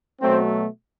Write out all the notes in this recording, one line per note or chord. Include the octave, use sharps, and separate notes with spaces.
B2 F#3 A3 C4